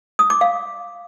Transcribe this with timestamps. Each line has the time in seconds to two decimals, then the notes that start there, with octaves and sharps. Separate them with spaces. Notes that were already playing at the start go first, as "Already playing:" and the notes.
0.19 D#6
0.30 D6
0.41 F5